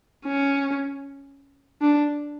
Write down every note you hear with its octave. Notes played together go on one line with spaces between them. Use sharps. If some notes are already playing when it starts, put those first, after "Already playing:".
C#4
D4